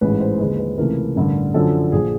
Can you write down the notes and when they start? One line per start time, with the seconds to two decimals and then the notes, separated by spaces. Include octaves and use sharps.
0.01 A1 G#2 E3 G#3 B4
0.20 C5
0.39 D#2 D3 F3 G#3 B4
0.59 B4
0.78 C#2 C3 E3 A3 A#4
1.16 A1 G2 D3
1.54 F#2 D3 F3 A4
1.92 A#1 F3 G#4